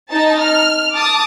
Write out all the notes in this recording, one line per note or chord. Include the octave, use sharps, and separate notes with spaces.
D#4 A5
F6
A5 D6 D#6